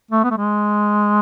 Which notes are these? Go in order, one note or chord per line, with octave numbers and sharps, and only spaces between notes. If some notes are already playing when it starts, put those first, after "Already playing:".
A3
B3
A3
G#3